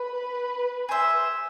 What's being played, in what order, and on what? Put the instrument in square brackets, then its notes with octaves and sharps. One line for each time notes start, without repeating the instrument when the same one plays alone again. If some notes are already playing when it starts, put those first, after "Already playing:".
Already playing: [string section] B4
[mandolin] G#4 C5 E5